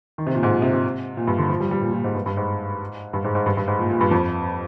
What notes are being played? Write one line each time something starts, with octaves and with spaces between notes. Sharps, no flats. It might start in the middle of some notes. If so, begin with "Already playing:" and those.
D#3
C3
A#2
G#2
A#2
C3
C3
A#2
G2
D3
F3
G3
G3
A#2
A#2
G#2
G2
G2
G#2
G2
G#2
G#2
G2
G2
G#2
A#2
A#2
G2
F2